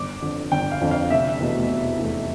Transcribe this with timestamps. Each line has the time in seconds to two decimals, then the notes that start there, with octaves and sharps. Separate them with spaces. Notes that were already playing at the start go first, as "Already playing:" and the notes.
Already playing: G1 D6
0.22 F2 D3
0.52 G1 G5
0.72 F5
0.81 F2 D3
0.91 F5
1.10 F1 E5
1.40 E2 B2 A3
1.70 F1
1.99 E2 B2 A3